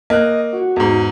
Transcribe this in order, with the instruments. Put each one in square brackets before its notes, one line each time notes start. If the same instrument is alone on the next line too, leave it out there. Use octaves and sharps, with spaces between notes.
[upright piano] A#3 F#6 [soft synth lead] D#5
[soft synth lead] F#4
[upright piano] E2 G#2